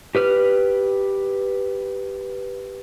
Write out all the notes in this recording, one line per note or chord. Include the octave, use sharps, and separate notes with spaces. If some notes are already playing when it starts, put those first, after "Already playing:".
G4 B4 F6